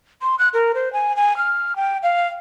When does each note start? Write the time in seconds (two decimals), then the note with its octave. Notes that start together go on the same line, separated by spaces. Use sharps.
0.22 C6
0.39 F#6
0.54 A#4
0.75 C5
0.93 G#5
1.16 G#5
1.37 F6
1.76 G5
2.03 F5